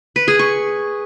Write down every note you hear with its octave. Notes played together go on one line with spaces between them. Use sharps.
B4
G#4
C#6